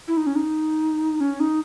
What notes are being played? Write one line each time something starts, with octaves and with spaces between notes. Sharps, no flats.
E4
D#4
C#4
D#4
C#4
D#4